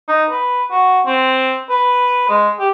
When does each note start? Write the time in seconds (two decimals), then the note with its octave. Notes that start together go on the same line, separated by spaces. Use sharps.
0.09 D#4
0.30 B4
0.71 F#4
1.06 C4
1.70 B4
2.29 G#3
2.59 G4